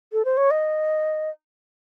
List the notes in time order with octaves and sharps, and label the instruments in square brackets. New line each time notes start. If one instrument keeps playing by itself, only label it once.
[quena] A4
C5
C#5
D#5